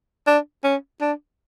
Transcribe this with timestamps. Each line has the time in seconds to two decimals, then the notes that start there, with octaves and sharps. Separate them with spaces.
0.27 D4
0.64 C#4
1.01 D4